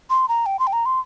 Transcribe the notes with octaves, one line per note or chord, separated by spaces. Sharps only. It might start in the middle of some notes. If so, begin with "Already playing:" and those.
C6
A#5
G5
C6
G5
A#5
C6